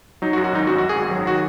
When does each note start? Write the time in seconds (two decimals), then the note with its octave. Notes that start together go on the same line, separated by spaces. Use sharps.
0.22 F#3 D#4
0.33 F#4
0.37 F#2
0.44 F#4
0.53 G#1 D#4
0.67 F#2 F#4
0.78 F#2 F#4
0.89 G#4
0.97 G#1
1.11 F#3
1.26 D#3 F#4